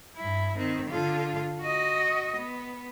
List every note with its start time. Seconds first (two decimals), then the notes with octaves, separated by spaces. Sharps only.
0.17 G2 E4
0.55 D#3 C4
0.90 D3 F4
1.60 F#4 D#5
2.37 B3